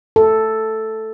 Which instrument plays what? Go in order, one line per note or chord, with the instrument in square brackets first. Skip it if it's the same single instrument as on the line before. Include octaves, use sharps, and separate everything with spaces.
[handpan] A4